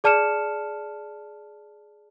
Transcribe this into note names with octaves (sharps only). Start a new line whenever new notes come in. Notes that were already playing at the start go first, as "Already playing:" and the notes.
G#4 D5 A5 F6 C#7 E7